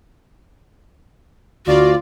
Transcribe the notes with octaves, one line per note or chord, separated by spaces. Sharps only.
D2 F4 F#4 D5